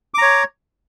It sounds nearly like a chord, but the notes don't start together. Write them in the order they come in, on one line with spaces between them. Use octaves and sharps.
D6 A#5 C#5